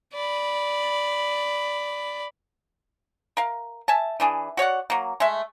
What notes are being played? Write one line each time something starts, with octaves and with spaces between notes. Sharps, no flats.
D5 B5
A#4 F5
E5 G#5 A5
E3 D4 G#4
F#4 C#5 D5 F#5
F#3 A#3
G#3 A3 E5